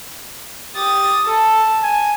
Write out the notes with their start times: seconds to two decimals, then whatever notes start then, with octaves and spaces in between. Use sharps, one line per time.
0.76 G4 D#6 A6
1.27 A4 A5
1.83 G#5